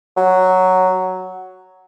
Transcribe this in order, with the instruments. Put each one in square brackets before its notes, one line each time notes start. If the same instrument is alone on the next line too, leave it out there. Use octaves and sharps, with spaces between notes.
[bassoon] F#3